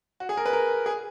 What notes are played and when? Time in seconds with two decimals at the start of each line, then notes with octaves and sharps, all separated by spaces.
0.20 F#4
0.29 G#4
0.37 A#4
0.46 B4
0.53 A#4
0.86 G#4